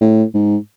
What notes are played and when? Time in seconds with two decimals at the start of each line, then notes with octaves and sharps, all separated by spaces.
0.01 A2
0.34 G#2